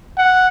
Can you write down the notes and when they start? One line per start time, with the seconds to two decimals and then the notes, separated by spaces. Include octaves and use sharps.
0.18 F#5